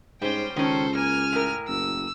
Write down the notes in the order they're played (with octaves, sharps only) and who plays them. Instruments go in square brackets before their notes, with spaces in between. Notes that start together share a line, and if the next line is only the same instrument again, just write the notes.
[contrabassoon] G#2 [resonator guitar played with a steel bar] G3 C#4 [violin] C5 G5
[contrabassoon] C#2 [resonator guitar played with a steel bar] D#3 C#4 [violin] A4 C5
[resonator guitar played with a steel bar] A#3 [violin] G#5 F6
[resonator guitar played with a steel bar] A2 A#4
[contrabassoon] F#1 [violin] E6